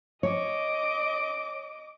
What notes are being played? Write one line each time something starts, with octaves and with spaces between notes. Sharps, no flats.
C#5 D#5 D6